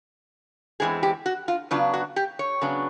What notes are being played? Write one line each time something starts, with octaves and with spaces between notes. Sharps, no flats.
E2 C#3 E3 G#3 C4 G#4
G4
F#4
F4
C#3 F#3 B3 D4 F4
F#4
G4
C#5
C#3 F#3 B3 D4